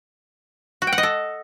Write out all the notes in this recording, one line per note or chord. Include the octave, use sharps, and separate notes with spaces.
F#4
G5
F#5
D#5
A4